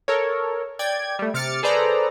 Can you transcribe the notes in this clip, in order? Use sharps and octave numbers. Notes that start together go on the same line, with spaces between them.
A4 A#4 C#5
D5 G5 G#6
G3 A3
C3 D6 F6 A6 C#7
G#4 A4 B4 C5 D5 A#5